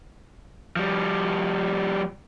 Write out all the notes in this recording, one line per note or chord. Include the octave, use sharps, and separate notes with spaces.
F3 G3